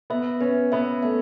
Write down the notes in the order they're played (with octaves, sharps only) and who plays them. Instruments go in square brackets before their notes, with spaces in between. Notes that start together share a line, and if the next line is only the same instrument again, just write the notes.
[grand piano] B3 [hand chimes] E5
[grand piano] C#4 [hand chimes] B4
[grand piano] B3 [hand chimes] E5
[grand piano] A3 [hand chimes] E5